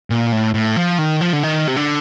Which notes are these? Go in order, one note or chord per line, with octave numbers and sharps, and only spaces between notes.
A#2
A2
A2
F3
D#3
F3
D3
D#3
C3
D3